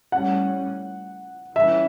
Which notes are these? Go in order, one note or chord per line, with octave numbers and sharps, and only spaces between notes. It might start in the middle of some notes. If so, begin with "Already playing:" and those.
A2 G3 C#4 F#5
E3 G3 C#4 E5